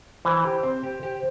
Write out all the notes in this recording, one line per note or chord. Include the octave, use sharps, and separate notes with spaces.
E3 C5
G4
C4
G4
G4